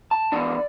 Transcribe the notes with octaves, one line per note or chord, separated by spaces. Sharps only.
A5
E3 B3 D4 D5